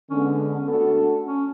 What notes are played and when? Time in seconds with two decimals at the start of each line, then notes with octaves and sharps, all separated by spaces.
0.09 D3 G#3 B3 C#4
0.57 C#4
0.68 A3 B3 D4 F#4 A4
1.27 C#4